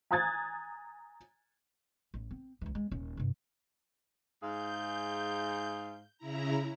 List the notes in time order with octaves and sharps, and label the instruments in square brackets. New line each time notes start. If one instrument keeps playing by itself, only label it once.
[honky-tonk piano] G#5 A#5 D#6 F#6 G#6 A6
[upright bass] A1
C4
C#2 E3
G#3
D#1 C#4
G2 C3
[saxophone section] G#2 G#4 F5 [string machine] G6
[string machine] C#3 E4 A#5